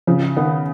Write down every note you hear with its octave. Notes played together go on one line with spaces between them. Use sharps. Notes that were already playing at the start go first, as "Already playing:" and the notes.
C#3 F3
D#3 B3